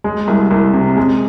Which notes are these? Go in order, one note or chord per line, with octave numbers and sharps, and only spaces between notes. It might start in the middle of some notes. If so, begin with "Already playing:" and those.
G#3
C2
C2
C3
G#3